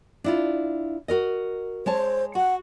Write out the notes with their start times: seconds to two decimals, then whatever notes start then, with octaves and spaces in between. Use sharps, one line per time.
0.24 D4 E4 F4
1.08 F#4 A#4 D#5
1.86 G#3 C5 C#5 A5
2.35 F#4 F#5